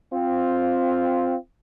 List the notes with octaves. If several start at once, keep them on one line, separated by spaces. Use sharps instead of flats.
C4 F4